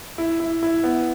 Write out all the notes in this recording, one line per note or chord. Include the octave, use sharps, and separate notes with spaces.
E4
E4
E4
B3